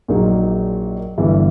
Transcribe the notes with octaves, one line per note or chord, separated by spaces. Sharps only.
A#1 A#2 F#3 A#3 D#4
G1 G2 E3